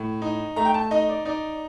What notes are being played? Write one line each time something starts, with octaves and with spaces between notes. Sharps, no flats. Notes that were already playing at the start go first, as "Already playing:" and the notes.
Already playing: A2
D#4
A3 A#5
G5
A5
D#4 D#5
D5
D#4 D5